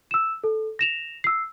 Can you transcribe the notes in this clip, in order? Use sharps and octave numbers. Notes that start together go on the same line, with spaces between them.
E6 E7
A4
A#6 E7 F7
E6 C7